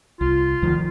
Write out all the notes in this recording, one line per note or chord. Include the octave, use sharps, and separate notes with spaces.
C2 F4
D2 D#3 F3